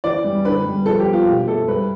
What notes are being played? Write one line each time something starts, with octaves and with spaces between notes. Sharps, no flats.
E3 D5
G3
D3 B4
G3
F3 A4
G4
B3
F4
B2 G4
A3 A4
G3 B4